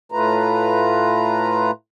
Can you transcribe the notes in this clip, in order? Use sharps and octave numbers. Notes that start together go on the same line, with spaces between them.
A2 A3 F4 B4 A#5